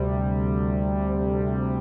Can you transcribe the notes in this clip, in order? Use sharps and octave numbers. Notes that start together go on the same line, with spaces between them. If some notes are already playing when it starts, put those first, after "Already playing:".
Already playing: D2 C3 G3